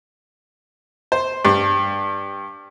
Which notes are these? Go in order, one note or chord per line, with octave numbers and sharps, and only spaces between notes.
C5
G2